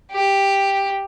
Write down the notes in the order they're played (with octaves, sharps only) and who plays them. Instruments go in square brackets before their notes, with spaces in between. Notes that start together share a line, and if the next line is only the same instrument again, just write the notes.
[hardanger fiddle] G4